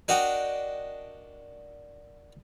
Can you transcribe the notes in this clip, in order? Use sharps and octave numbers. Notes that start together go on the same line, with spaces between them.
D4 F#4 A#4 D#5 F#5 G5